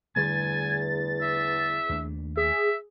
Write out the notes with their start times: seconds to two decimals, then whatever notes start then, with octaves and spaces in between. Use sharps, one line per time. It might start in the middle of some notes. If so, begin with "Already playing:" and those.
0.16 E2 D3 G3 A3 G#5 A6
1.22 E5
1.89 D#2 A3 D4
2.37 G#4 E5